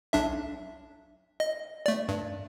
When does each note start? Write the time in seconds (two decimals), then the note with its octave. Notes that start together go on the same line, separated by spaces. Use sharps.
0.13 B1 D4 E5
1.40 D#5
1.86 A3 D5
2.09 G2